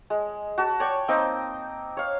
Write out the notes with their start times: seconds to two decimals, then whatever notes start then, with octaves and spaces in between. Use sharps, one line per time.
0.10 G#3
0.58 F#4 A5
0.80 C#5 D5 G5 C#6
1.08 A#3 C4 D#4 G5
1.97 C#5 F5